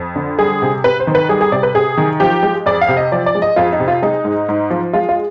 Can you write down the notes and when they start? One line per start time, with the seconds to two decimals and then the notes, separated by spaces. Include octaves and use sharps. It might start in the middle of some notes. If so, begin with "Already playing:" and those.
Already playing: F2
0.16 D3
0.39 G3 G#4
0.62 C3
0.84 C3 B4
1.00 C5
1.07 D#3
1.15 B4
1.29 G3 G#4
1.41 G#4
1.52 C3 D5
1.63 B4
1.74 C3 G#4
1.97 D#3
2.20 F3 G4
2.43 G#3
2.66 F2 D5
2.81 F5
2.88 C3
2.97 D#5
3.12 F3 D5
3.26 D5
3.35 G#3
3.42 D#5
3.56 F2 F4
3.73 D#4
3.79 C3
3.88 F4
4.02 G#3 D#4
4.25 G#2
4.49 G#2
4.70 F3
4.93 G#3 F4
5.09 F4